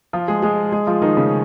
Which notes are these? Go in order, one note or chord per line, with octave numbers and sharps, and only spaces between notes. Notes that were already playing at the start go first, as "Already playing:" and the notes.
F3 F4
G#3 G#4
G#3 G#4
G#3 G#4
F3 F4
D#3 D#4
C#3 C#4